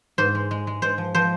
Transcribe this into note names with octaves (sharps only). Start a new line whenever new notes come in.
G#2 C5
G#3
G#3
G#3
G#3 C5
F3
F3 C5